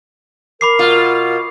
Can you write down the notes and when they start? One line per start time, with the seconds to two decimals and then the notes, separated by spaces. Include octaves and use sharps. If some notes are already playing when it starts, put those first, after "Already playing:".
0.61 A#4 B5 D6 C7
0.79 B2 F4